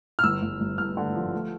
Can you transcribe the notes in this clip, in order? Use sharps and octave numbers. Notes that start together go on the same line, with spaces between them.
F6
G1 E6
G1
G1
G1 F6
D3
F3
A3